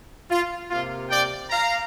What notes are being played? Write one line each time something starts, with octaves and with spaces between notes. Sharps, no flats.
F4
C3 A#3 F4
D5 G5
F5 A#5